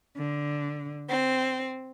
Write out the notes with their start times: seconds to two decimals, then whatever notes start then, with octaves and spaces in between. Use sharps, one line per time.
0.18 D3
1.08 C4